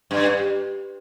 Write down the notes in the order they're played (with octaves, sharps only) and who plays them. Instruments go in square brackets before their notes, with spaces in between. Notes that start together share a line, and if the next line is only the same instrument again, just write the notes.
[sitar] G2